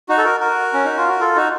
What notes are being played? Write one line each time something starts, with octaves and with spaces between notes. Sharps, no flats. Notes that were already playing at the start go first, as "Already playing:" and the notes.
D#4 F#4
A4
F#4 A#4
F#4 A#4
C#4
D#4
F4
F#4
F4 A4
D#4 F#4